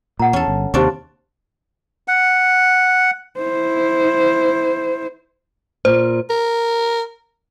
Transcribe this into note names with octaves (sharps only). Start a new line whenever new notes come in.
A#2 F#5 A#5
E2 C#4 A4
G1
D#2 C3 D4 F4 G4 C5 D5 C#6
F#5
E4 C5
A#2 C5
A#4